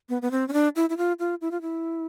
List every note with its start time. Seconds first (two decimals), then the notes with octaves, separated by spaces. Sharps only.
0.09 B3
0.22 B3
0.31 C4
0.48 C#4
0.53 D4
0.76 E4
0.90 E4
0.97 F4
1.19 F4
1.41 E4
1.51 F4
1.62 E4